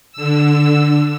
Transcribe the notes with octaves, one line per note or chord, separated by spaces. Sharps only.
D3 E6